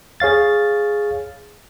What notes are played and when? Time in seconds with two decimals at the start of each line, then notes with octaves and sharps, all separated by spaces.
0.20 G#4 C#5 F5 A6